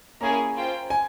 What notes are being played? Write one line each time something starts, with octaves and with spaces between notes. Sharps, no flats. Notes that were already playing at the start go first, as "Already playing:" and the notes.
A#3 C#4 E4 G#4 A#5
F4 C5 G5
G#5